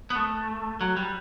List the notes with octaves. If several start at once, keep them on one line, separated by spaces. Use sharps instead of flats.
B3
A3
F#3
G3